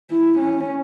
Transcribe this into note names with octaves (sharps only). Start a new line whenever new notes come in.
E4
C#4